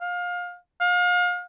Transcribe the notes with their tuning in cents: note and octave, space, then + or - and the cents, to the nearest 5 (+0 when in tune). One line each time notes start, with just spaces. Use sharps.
F5 +25
F5 +35